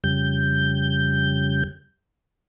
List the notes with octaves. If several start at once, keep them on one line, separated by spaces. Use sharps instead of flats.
F2 C#3 G3 G6